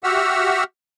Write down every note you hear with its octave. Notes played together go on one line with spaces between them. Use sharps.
F#4 G4 E5 F#5 E6 F6